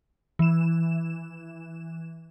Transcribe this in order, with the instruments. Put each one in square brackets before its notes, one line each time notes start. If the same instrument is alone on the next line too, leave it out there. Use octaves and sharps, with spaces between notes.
[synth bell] E3 E7